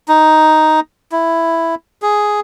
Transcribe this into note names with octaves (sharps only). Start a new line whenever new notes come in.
D#4
E4
G#4